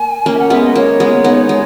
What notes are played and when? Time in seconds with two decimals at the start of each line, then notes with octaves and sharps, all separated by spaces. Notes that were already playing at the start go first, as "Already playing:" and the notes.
Already playing: A#3 G#5
0.26 A#3 C#4
0.34 E5
0.39 F#5
0.50 G#3 B3 E5
0.64 D#5
0.76 A#3 C#5
1.00 G#3 B3
1.24 B3 D#4
1.49 G#3